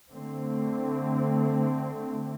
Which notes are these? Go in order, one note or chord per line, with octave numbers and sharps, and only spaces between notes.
D3 A3 C4